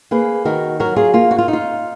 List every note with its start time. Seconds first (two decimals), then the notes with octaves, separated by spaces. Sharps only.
0.11 A#3 G#4 B4
0.45 D#3 F#4 A#4
0.80 F#3 F#4 A#4
0.96 F4 G#4
1.13 A#3 F4
1.31 F#4
1.38 F4
1.48 D#4
1.53 F4